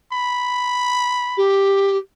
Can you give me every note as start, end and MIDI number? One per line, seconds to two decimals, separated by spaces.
0.13 1.43 83
1.37 1.97 67